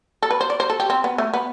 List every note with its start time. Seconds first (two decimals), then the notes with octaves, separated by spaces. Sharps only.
0.22 A4
0.31 B4
0.41 C5
0.50 D5
0.60 C5
0.70 A4
0.80 G4
0.90 C4
1.04 B3
1.18 A3
1.34 B3